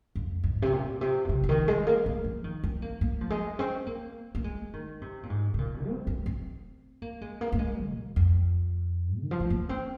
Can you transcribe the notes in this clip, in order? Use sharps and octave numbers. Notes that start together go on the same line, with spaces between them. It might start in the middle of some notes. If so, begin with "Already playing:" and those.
F2
G#2
C3
A#2
C3
A#2
C3
C3
D#3
G#3
A#3
A#3
F3
D#3
C4
A#3
A#3
F3
G#3
C4
A#3
A#3
G#3
D#3
C3
A#2
G#2
C3
A#2
C4
C4
C4
A#3
G#3
A#3
A#3
G#3
A#2
F2
D#3
F3
G#3
A#3
C4